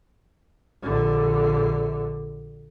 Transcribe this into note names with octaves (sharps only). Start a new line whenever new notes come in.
A#1 D3